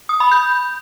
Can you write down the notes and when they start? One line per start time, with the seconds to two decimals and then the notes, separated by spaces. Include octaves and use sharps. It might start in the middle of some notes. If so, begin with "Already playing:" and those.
0.09 D#6
0.20 B5
0.32 G6